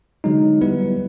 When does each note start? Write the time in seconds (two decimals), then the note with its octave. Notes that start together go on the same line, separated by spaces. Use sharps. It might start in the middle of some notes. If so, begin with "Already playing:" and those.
0.24 D3 F#3 G#3 D#4
0.61 G3 B3 E4 B4